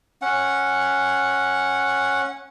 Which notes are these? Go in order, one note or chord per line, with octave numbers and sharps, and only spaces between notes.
C#4 F#5